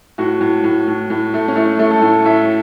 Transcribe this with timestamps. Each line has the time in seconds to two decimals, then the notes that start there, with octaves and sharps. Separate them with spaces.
0.18 A2 F#4
0.41 A2
0.64 A2
0.87 A2
1.10 A2
1.34 A3
1.48 C#4
1.56 A3 E4
1.79 A3
1.91 A4
2.02 A2
2.25 A2 E5